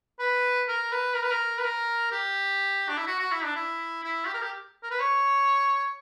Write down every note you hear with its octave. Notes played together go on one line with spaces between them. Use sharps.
B4
A#4
B4
A#4
B4
A#4
B4
A#4
G4
D4
E4
F#4
F#4
E4
D4
E4
E4
G4
A#4
G4
A#4
B4
C#5